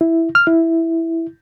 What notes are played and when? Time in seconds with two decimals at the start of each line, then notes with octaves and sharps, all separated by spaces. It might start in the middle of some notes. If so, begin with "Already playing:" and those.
0.01 E4
0.35 F6
0.47 E4